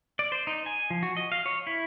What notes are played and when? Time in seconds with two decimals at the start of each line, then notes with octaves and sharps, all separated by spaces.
0.19 D5
0.32 C5
0.47 D#4
0.66 G#5
0.90 F3
1.03 F#4
1.17 D#5
1.32 F5
1.46 C#5
1.67 E4